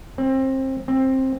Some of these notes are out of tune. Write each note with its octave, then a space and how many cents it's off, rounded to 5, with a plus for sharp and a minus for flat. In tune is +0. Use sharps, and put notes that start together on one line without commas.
C4 +25
C4 +15